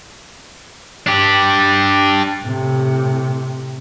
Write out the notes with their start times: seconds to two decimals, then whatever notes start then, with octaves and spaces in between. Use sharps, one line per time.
1.06 D4 G4
2.41 A2 C3